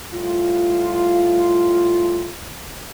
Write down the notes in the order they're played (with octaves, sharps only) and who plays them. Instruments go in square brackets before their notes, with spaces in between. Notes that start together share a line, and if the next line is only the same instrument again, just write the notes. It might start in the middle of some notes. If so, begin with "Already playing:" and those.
[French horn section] A2 G3 F4